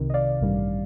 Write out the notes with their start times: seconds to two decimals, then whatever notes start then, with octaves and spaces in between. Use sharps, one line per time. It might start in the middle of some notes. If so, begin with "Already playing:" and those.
Already playing: C2 C3 D#3
0.10 D#5
0.14 D5 F5
0.41 A1 G2 D#3 G3